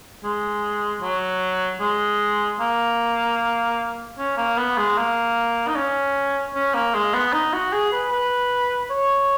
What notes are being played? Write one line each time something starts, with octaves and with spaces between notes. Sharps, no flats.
G#3
F#3
G#3
A#3
C#4
A#3
B3
G#3
A#3
D#4
C#4
C#4
A#3
G#3
B3
D#4
F#4
G#4
B4
B4
C#5